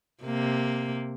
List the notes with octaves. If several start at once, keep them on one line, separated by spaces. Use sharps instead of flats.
C3 A#3